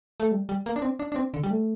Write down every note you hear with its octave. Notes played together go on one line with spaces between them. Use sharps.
A3
G3
G3
A#3
D4
C4
D4
D4
C4
D3
G3
A3